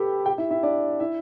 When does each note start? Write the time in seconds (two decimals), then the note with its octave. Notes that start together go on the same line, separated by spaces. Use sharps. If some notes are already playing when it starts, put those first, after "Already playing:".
Already playing: G4 A4 B4 G5 B5
0.26 G4 G5
0.38 E4 E5
0.51 E4 E5
0.63 D4 D5
1.00 E4 E5